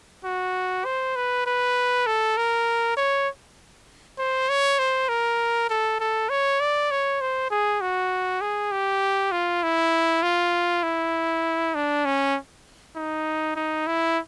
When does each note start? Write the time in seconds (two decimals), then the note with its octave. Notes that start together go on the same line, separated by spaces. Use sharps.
0.24 F#4
0.85 C5
1.16 B4
1.46 B4
2.07 A4
2.37 A#4
2.97 C#5
4.19 C5
4.49 C#5
4.79 C5
5.09 A#4
5.70 A4
6.00 A4
6.30 C#5
6.60 D5
6.91 C#5
7.21 C5
7.51 G#4
7.81 F#4
8.41 G#4
8.72 G4
9.32 F4
9.63 E4
10.23 F4
10.83 E4
11.75 D4
12.05 C#4
12.96 D#4
13.56 D#4
13.87 E4